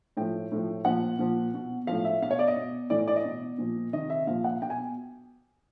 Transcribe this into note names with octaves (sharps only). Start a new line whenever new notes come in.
A2 F3 G5
A2 F3
A#2 F3 F#5
A#2 F3
B2
A2 F3 F5
E5
B2 F5
C#5
D5
D#5
B2
A2 E3 D5
D5
D#5
B2
A#2 F3
C3 D#3 D#5
E5
A#2 F3 F5
F#5
B2 G5
G#5